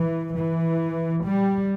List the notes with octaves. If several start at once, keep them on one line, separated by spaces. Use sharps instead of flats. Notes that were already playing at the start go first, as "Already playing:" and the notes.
Already playing: E3
E3
G3